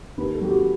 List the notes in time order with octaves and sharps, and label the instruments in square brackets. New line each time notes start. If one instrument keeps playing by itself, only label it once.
[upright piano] D#2 B4
A4
F#3 G4
F#4